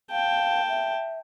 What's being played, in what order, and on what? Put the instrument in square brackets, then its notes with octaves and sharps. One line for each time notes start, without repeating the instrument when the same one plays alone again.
[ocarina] F5 [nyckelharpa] G5 A5
[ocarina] E5